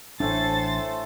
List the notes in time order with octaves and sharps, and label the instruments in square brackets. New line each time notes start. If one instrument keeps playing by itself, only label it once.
[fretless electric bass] A1 D4 [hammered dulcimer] A2 A3 G#5 [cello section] A4 C5 [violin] A6